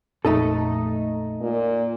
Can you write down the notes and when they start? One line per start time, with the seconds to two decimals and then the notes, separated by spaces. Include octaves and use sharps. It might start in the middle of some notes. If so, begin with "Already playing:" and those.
0.25 A1 F2 A#2 A3 D#4 A4
1.41 A#2